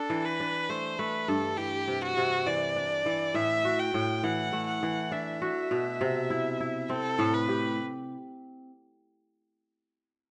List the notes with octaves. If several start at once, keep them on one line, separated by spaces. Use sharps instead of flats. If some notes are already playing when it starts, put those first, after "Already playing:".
Already playing: D4 A4
E3
B4
D4
A3 C5
A3 B4
G2 A4
E3 G4
C3
F#4
C3
E3 D5
D4
E3
A2 E5
F#4
G5
A2
E3 F#5
A3
F#5
E3
D4 E5
F#4
B2
C3
E4
E4
C4 A4
A2
B4
G4